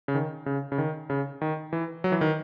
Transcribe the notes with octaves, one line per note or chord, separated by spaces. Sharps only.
C#3
D#3
C#3
C#3
D#3
C#3
D#3
E3
F#3
E3
D#3